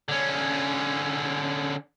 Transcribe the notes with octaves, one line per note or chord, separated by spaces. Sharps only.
D3 C#4